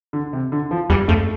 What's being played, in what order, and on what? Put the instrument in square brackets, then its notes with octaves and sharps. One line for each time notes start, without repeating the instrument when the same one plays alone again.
[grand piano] D3
C3
D3
F3
[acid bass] E2 [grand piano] G3
[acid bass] F2 [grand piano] A3